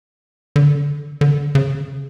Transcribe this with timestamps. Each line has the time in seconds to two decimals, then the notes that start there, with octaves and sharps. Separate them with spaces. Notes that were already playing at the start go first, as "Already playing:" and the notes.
0.56 D3
1.21 D3
1.55 C#3